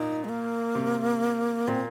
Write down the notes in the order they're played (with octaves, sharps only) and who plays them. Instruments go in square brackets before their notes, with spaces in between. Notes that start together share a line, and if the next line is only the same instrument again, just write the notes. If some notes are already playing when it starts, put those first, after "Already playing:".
Already playing: [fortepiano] A#2 [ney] D#4
[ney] G#3
A#3
[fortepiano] C3
[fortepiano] A#2 [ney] C4